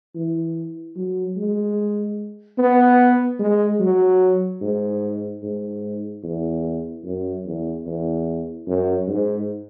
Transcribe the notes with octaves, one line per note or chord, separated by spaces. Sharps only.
E3
F#3
G#3
B3
G#3
F#3
G#2
G#2
E2
F#2
E2
E2
F#2
G#2